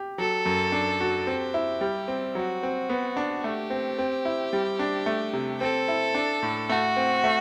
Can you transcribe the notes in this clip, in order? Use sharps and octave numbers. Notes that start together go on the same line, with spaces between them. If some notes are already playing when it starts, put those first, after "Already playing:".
Already playing: G4
F#3 A4
F#2
D4
F#4
C4 G4
E4
G3
C4
F#3 F#4
C4
B3
D4
A3 G4
C4
C4
E4
G3
D4
A3
C3
C4 A4
E4
D4
A2
A3 F#4
C4
A3